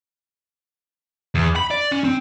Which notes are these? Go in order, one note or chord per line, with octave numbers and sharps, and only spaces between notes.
E2
B5
D5
C#4
C4